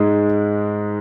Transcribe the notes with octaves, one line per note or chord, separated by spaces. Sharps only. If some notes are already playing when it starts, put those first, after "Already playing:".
Already playing: G#2 G#3